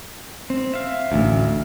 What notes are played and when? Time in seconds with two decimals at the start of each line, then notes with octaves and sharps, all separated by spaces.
0.50 C4
0.74 E5 F5
1.12 A1 D2